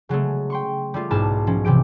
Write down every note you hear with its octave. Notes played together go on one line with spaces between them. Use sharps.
C#3 F#3 G#3 A3
G5 C6 C#6
G3 A3 F4
B1 G#2 E4 A5 F6
F3 C#4
C3 E3 G4 D7